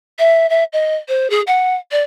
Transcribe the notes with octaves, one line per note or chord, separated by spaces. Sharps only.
E5
E5
D#5
C5
G#4
F#5
D5